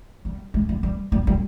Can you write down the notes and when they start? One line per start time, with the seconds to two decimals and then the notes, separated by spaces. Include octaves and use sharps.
0.25 G3
0.54 G#3
0.69 G3
0.83 G3
1.12 G3
1.27 G3